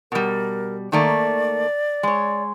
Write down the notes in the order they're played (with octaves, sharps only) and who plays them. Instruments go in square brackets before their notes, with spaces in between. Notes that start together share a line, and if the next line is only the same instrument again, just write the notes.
[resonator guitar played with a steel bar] B2 G3 [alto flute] A#4
[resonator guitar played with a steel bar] D#3 A3 A#3 [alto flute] D5
[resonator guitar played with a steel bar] G#3 C#5